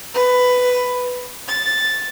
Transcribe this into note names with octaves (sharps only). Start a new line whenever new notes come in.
B4
A6